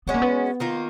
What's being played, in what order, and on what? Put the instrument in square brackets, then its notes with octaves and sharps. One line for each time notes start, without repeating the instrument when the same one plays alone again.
[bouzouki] G#3 C#4 F#4 [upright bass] B3
[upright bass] A#3
B3
[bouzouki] D#3 A#3 F4